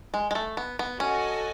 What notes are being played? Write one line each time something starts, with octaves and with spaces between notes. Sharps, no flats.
G#3
G#3
A3
B3
B3
C#4 F#4 A4 D#5 G#5